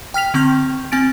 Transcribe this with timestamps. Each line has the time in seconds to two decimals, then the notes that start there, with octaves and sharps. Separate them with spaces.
0.14 G5 F6 B6 F7
0.34 D3 C4 C#6 G6
0.92 C4 G#5 A6 D7